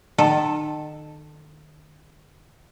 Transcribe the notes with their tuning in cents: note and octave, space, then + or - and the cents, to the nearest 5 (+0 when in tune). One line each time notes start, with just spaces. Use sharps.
D#3 -35 A4 +0